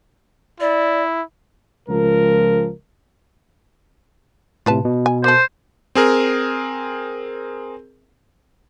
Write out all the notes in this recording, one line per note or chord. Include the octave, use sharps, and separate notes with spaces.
E4 D5
C#2 F3 A#4
A2 C3 F4 B4 A5
B2
G#5
A#3 A4 C5
C4 G#4 A#4